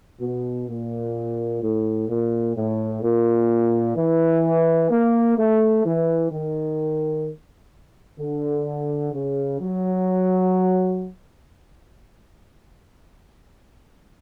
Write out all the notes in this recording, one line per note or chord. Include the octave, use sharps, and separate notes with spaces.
B2
A#2
A2
A#2
A2
A#2
E3
A#3
A3
E3
D#3
D3
C#3
F#3